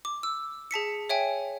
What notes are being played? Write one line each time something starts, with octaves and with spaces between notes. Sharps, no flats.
D6
E6
G#4 A5 B6 C#7
C#5 E5 G5 G#5